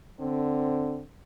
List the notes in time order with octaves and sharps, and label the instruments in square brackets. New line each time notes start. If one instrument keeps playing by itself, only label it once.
[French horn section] D3 C4